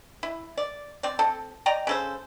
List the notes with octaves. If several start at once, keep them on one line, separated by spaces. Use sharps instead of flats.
E4
D5
C4 D5
C4 A4
D5 D#5 G5 A#5
C#3 A4 C5